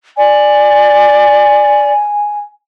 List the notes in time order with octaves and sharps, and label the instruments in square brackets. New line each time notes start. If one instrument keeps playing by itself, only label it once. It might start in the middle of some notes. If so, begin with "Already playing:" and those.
[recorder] D5 [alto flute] G#5